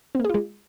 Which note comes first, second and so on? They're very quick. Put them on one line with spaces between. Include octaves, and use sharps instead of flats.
C4 A#3 G#4 F4 G#3